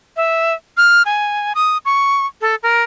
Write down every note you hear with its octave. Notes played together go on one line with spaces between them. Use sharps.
E5
F6
G#5
D#6
C#6
A4
A#4